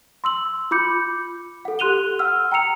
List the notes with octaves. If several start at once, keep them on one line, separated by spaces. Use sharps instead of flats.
C6 E6 F#7
F4 B5 D6 G6 C#7
A4 F#5
G4 C6 F#6 D#7 F7 G7
F#5 E6 F6
G5 A#5 E6 C#7 F7